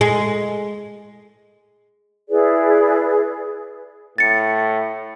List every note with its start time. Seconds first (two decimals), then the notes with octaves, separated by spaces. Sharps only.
0.01 G#3
2.30 E4 G#4 B4 D5
4.18 A2 A6 C#7